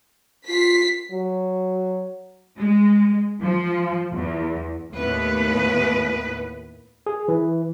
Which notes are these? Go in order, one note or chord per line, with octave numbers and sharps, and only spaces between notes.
F4 B6 C7
F#3
G#3
F3
E2
D#2 A2 B3 B4
G#4
E3